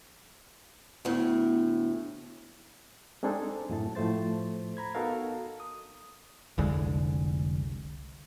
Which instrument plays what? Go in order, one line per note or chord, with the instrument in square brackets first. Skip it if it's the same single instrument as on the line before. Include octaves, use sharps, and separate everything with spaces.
[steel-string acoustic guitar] D2 A2 [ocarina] B3
[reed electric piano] G#3 C4 D4 D#4 G#4 A4
F#2 A2 A5
A2 F3 A3 C5 A6
A#5 B5 G#6
B3 D#4 F#4 A4 A#4 F5
D#6
[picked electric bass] F1 C2 D3 G#3